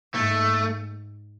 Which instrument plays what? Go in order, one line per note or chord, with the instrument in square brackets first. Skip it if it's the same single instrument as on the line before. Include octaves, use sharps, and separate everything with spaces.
[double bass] G#2 [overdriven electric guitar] A3